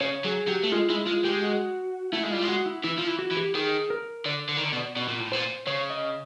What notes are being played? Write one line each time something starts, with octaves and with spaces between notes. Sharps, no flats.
C#3 C#5
F#3 G#4
F#3 G4
A3
G#3 F4
G#3 E4
G#3 F4
G#3 G4
F#4
A3 E4
G#3
G3 F4
G#3
F#4
E4
E3 E4
F3
E3
F#4
E3
G4
D#3 G#4
A#4
D3 D5
D3
D#3
D3
B2
B2
A#2
A2
A#2 C5
C#3 C#5
D#5